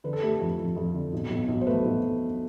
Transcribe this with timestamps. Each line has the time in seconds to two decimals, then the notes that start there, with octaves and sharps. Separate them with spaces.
0.04 D3 B4
0.13 A4
0.22 A3 G4
0.32 A4
0.40 F2
0.59 F2
0.76 F2
0.94 D3
1.13 B1
1.30 B1
1.48 B1
1.61 C5
1.67 A3 B4
1.85 B1